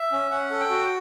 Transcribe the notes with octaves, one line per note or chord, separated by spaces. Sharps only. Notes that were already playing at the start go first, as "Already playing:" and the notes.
Already playing: E5
C#4
C#4 F#5
A4
G5
F#4